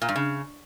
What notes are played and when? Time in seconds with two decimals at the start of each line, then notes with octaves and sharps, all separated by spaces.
0.02 A#2
0.09 G2
0.16 C#3